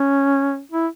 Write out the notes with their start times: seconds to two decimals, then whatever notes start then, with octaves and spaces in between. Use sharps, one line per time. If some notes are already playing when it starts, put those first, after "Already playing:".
Already playing: C#4
0.71 E4